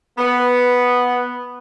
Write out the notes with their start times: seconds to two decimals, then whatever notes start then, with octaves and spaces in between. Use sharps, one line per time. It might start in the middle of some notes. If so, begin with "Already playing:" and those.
0.18 B3